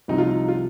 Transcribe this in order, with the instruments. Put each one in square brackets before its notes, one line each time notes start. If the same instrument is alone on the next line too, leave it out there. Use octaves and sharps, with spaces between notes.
[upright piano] C2 C3 F3 D#4
F4
D#4
F4